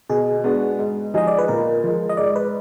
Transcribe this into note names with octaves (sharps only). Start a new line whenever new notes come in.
B2 G#4
G#3 B3 D4 F#4
G#2
F3 G#3 D#4 G#4 D#5
D5
B4
A#2 A#4
F3 G#3
D#5
G#2 D5
B4